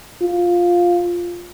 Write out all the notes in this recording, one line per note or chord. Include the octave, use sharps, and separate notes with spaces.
F4